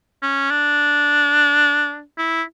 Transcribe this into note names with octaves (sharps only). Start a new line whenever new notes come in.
C#4
D4
E4